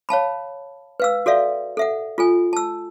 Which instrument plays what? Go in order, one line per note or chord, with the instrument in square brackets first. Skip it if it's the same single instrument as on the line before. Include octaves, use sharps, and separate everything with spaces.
[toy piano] C#5 F5 A5 B5
B4 F5 E6
F#4 A4 D5 E5 F5
A4 E5 F#5
F4 A4 G#5
A5 E6